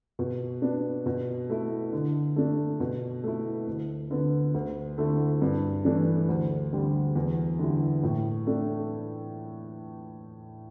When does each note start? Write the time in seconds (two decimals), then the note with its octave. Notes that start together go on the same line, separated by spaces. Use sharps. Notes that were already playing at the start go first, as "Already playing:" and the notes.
0.19 B2
0.62 B3 D4
1.06 B2
1.50 A3 E4
1.93 D3
2.36 A3 D4
2.80 B2
3.23 A3 E4
3.67 D2
4.11 D3 B3
4.54 D2
4.98 D3 A3 E4
5.42 G2
5.85 E3 A3 D4
6.28 D2
6.73 D3 G3
7.15 E2
7.59 D3 G3 E4
8.03 A2
8.47 A3 D4